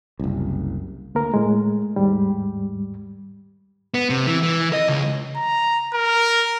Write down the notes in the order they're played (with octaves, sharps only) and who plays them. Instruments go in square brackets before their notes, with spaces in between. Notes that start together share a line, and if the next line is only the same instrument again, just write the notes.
[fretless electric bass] F#1 C2
[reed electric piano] D2 A#3 A#4
A2 G#3
D#2 G#2 G3
[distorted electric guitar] B3
C3
E3
E3
D#5
C#2
[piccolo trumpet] A#5
A#4